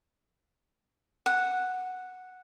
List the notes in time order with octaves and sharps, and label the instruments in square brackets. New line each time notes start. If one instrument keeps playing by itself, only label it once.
[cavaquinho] F#5